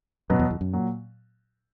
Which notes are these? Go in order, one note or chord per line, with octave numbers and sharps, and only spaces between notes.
F#2 B2 F#3 B3
E2
E2
F#2
A#2 F#3